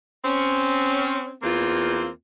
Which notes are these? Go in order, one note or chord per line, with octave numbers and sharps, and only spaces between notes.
C4 C#4
E2 A#3 C4 F4